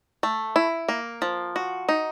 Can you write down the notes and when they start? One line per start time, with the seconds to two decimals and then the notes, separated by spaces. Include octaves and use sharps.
0.23 A3
0.56 E4
0.89 A#3
1.22 F3
1.56 F#4
1.89 D#4